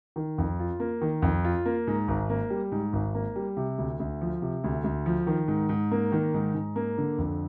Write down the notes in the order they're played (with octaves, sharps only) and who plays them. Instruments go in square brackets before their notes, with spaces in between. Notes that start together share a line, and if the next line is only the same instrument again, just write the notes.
[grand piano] D#3
F2
F4
A#3
D#3
F2
F4
A#3
G#2
G#1
A#3
G3
G#2
G#1
A#3
G3
C3
D2
D2
F3
C3
D2
D2
F3
D#3
G#2
G#2
A#3
D#3
G#2
G#2
A#3
D3
F2